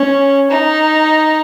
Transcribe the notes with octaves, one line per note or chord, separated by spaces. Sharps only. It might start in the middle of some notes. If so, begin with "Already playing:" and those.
Already playing: C#4
D#4